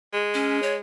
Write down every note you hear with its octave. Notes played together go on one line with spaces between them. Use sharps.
G#3
C#4
C#5